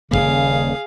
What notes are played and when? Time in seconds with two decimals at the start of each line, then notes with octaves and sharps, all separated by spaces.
0.11 D#1 F2 C#3 A#3 G#4 F5